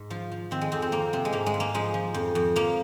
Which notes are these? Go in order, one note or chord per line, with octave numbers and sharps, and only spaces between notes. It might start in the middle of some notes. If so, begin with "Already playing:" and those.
Already playing: G#2
F3 F4
F3
D#3 C4
G#3
F2 C4
C4
F2 A#3
C3 C4
G#3
G#2 A#3
G#3
G#2
A#3
F3 G#3
F3
F2
F2
F3 A#3